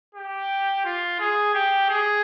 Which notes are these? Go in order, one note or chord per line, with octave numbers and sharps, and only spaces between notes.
G4
F4
G#4
G4
G#4